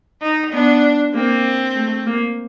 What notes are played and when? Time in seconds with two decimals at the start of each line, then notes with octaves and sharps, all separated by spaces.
0.22 D#4
0.53 B3 D4
1.14 A#3 C4
1.75 A3
2.06 A#3